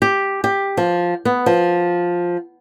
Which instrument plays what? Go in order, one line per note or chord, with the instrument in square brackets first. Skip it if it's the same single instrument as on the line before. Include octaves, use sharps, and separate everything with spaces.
[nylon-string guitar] G4
G4
F3
B3
F3